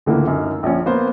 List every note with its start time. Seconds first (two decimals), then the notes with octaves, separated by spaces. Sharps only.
0.06 C#2 A2 D3 E3 A#3
0.27 F#2 D#4
0.63 A#1 F3 C#4
0.86 A#3 B3 A#4 C5